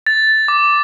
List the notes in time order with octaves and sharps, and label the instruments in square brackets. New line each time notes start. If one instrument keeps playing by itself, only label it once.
[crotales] A6
D6